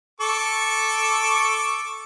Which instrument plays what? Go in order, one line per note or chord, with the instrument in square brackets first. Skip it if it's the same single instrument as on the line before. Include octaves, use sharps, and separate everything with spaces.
[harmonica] A4 C#6 D6